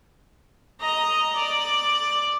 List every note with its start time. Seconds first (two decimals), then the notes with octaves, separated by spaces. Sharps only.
0.81 D#5 A#5
1.35 D5